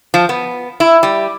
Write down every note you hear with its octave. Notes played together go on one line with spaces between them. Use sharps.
F3
B3
E4
G3